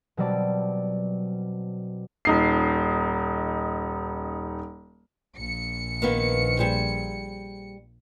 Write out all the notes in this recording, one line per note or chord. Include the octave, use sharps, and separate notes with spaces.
B2 F#3 G3 C4 D5 A5
D#1 D#4 C7
A#1 C#7
D#3 A#3 B3
G3 G#4 C5